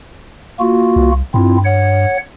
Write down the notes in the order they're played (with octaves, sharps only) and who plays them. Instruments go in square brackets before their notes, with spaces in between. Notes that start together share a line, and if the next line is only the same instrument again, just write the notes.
[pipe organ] A#3 F4 F#4
[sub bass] C2
[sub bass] G2 [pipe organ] C4 E4 F4
[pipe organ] C#5 F#5